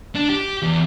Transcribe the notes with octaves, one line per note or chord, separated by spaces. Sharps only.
D4
G4
E2